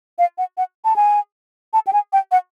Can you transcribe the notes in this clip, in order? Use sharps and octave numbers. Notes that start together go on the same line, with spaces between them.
F5
F#5
F#5
A5
G#5
A5
G5
G#5
G5
F#5